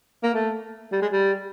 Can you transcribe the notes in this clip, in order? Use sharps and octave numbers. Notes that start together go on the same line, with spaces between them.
A#3
A3
G3
G#3
G3